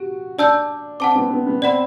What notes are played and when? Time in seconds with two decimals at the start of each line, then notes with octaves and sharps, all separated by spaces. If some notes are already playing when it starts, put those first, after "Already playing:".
Already playing: F#4 G4
0.38 D4 D5 A5 E6 G6
1.00 C4 F#5 A5 D6
1.15 B3
1.31 B3
1.47 B3
1.62 C4 D5 F#5 B5